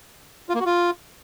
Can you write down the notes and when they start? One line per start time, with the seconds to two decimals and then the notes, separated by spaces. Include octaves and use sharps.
0.49 F4
0.55 A#3
0.60 F#4
0.65 F4